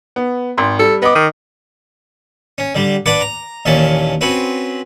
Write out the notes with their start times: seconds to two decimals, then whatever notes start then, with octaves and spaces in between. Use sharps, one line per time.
0.16 B3
0.58 G#1 C6
0.79 G3 A4
1.02 B3 D#5 D6
1.15 D#3
2.58 C#4
2.75 D3 G3
3.06 D4 B4 D5 F#5
3.21 A#5
3.65 D#2 A#2 E3 C#4 A5
4.21 C4 C#4 F#4 B4